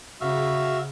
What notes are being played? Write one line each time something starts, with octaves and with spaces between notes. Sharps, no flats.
C#3 F#4 E5 F5